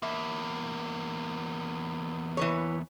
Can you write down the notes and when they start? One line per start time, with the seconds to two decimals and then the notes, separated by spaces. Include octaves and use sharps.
0.03 E2 A#3 E5
2.37 E3 B4 C#5